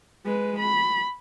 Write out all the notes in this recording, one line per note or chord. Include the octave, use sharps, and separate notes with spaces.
G#3 B4
B5